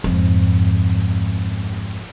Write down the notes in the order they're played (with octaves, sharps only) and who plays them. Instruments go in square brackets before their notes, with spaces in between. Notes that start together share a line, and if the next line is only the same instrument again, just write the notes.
[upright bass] F2 G#2